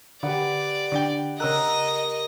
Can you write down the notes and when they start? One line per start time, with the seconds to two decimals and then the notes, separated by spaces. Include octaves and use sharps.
0.23 D3 G4 B4 D5 F#5
0.92 D3 D4 G5
1.40 C#3 A#4 D#5 E6 F#6